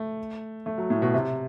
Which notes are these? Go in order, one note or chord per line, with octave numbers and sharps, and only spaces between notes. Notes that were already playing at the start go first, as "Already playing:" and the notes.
Already playing: A3
A3
F#3
A2
B2
C3